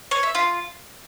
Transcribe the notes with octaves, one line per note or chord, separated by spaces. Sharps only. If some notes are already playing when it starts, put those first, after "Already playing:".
C#5
E5
F4